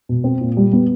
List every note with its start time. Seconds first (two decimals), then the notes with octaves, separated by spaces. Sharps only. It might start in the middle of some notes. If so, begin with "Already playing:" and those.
0.09 B2
0.24 C4
0.41 A#2
0.57 G3
0.73 B3